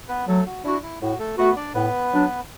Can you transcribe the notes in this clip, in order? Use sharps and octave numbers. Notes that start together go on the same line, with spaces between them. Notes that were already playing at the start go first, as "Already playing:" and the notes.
B3 B4
F#3 A3 A4
F#4
D4 E4 F#4
E4
A2 F#4
A3 A4
A3 B3 F#4 B4
D4 D5
A2 B3 B4
F#3 D4